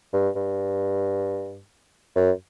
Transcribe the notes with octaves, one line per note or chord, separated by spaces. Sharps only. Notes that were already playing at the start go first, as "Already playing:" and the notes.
G2
G2
F#2